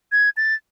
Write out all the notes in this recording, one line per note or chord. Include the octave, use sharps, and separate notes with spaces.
G#6
A6